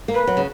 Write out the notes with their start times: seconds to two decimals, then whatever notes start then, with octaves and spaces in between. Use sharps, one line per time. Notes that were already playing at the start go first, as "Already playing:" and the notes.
0.08 A#3
0.14 B4
0.27 F#3
0.37 C#3